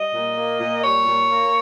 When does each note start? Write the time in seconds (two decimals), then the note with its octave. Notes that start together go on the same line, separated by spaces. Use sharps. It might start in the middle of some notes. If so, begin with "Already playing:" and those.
Already playing: G3 D#5
0.13 A#2
0.37 A#3
0.61 A#2
0.84 G3 C#5
1.07 A#2
1.30 A#3